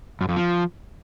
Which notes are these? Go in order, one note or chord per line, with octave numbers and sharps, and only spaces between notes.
F#2
F2
F3